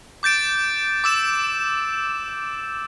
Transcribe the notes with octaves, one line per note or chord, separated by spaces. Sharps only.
D6 G6 A6 D7
D6 E6 E7